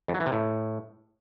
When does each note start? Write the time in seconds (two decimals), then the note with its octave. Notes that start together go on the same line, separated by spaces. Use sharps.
0.08 F2
0.14 F#3
0.20 E3
0.26 C3
0.32 A2